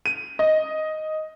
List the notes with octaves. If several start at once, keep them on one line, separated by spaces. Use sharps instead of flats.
D#7
D#5